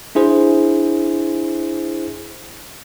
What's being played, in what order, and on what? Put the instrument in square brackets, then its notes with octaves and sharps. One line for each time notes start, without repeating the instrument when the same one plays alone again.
[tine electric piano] D4 E4 G#4 C5